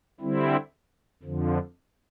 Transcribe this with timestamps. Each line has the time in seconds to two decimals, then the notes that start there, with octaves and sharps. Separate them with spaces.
0.20 D3 G3 C4 E4
1.23 F2 D3 F3